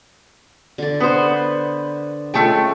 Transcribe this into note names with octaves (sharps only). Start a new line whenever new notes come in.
D3 D5
B3 C5
G#3 A3 C#4 F4 A4 G5